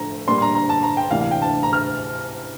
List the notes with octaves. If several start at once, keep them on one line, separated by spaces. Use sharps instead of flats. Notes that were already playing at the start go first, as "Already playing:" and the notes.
Already playing: A2 F3 A3 D4 A#5
A#2 G3 A#3 D4 C6
C6
A#5
A#5
A5
A#5
G5
D2 C3 E3 A#3 D4 F5
F5
G5
A5
A#5
F6